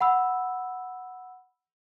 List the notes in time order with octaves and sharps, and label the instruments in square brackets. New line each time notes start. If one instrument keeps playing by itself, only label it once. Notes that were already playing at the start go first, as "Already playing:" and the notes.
[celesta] F#5 B5 E6